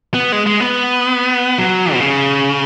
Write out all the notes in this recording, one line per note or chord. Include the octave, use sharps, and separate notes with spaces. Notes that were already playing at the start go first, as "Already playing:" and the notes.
B3
G#3
G#3
B3
F#3
B2
C#3